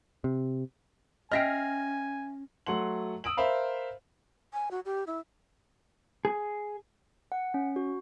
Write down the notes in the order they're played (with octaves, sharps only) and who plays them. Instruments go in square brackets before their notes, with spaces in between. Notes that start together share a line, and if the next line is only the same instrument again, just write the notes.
[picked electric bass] C3
[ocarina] C#4 [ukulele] D#5 E5 G5 [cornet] G#5 [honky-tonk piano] F6 A#6 C7
[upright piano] F#3 A3 F#5 C6 F#7
D#6 E6 D7 F#7
A#4 C5 E5 F5 B5
[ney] G#5
F#4
G4
E4
[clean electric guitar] G#4
[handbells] F#5
C#4
F#4